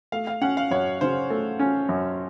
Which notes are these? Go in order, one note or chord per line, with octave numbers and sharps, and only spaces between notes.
A3 F5
F5
C#4 F#5
F5
F#2 C#5
C#3 C5
A3
C#4
F#2